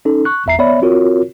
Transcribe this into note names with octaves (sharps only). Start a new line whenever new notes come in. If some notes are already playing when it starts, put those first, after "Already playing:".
C#4 D#4 A4
C#6 F#6
G1 E2 E5 A#5 C7
B3 C#5 D5 E5 B5
C4 F4 F#4 A#4 C#5